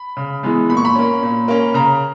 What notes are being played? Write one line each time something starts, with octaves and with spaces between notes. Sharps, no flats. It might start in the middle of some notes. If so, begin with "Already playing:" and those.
Already playing: B5
C#3
E3 G#3 B3
A#2 B5
C#6
B5
A#3 C#4
A#2
A#3 C#4
C#3 A#5